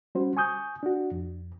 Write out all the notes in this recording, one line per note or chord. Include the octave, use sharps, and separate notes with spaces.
G3 C#4 F#4 C5
G#5 C#6 D#6 G6
D4 F#4
F2